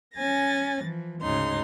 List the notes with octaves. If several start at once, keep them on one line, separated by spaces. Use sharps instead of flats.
C#4 G#5 A6 A#6
E3 F3
D2 G#2 C#3 D#4 C6